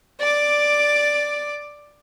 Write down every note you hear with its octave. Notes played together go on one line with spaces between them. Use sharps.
D5 D6